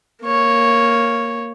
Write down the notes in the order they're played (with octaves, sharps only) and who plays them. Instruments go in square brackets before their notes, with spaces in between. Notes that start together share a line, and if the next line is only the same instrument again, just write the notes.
[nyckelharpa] A#3 C#5